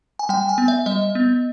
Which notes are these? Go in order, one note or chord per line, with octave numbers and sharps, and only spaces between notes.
G#5
G3 G5
G#5
B3
E5
G3 D#5
B3